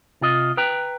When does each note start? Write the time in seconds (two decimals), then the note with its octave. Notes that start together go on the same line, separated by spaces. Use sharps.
0.21 C3 F4 D#5
0.57 B4 G5 A#5